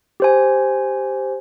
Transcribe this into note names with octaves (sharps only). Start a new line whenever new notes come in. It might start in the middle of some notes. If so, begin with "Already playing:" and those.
G4 C5 G#5